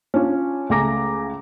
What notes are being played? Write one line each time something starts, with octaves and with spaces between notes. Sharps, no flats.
C#4 D4 F4
C#2 A3 G#5 A#5 D6 A#6